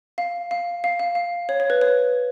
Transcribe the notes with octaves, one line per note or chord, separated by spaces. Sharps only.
F5
F5
F5
F5
F5
C#5
C#5
B4
C#5